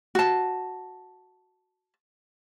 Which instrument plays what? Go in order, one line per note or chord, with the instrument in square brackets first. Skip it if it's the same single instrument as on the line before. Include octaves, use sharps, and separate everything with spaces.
[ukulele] F#4 A5